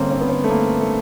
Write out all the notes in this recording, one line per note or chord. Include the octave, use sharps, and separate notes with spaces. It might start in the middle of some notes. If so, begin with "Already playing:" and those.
Already playing: G1 G2 D3 A#3 C4 C#4
C4
B3
C4
A3
A#3
A3